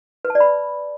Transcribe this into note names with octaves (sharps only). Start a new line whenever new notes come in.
B4
A5
D5
B5